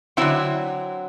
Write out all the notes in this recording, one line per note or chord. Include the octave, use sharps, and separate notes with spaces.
D3 F#3 C4 E4 E5